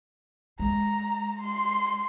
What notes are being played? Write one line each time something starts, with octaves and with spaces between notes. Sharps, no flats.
G#3 A#5
C6